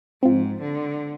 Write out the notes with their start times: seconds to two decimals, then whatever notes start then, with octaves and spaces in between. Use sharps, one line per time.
0.23 G#2 F3 C4
0.61 D3